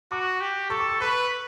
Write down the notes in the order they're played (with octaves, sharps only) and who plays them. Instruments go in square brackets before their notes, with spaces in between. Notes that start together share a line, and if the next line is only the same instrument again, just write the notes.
[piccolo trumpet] F#4 [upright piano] D6
[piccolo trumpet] G4
[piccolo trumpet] A4 [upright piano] C#6
[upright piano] D6
C#6
[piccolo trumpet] B4 [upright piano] C#6